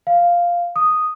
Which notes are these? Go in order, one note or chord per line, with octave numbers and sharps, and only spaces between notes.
F5
D#6